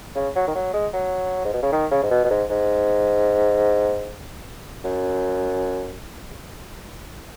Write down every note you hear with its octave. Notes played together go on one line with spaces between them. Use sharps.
C#3
F#3
D#3
F#3
G#3
F#3
G#2
B2
C#3
D#3
C#3
G#2
B2
B2
G#2
G#2
F#2